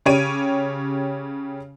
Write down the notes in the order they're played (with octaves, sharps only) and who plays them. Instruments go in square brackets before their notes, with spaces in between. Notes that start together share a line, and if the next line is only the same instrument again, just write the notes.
[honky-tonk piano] C#3 G4 C#5 D7 D#7